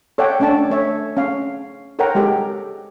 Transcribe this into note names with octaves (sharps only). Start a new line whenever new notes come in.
A4 C#5 D5 E5 F#5 G5
A3 C#4 D4 C#5 A5
A3 C#5 E5
C#4 F5
A4 A#4 C#5 F#5 G5 A#5
G#3 G4 A4